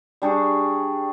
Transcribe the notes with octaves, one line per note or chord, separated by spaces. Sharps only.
G3 D4 G#4 C#6